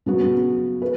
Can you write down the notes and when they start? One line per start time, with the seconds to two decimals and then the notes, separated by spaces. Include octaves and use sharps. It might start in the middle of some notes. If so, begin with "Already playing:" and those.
0.06 C#3 F#3 B3 F#4
0.82 B4